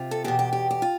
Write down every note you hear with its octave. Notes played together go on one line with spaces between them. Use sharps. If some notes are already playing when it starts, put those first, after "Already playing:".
Already playing: C3 F4
A4
E2 B2 G4
G4
G4
G4
F4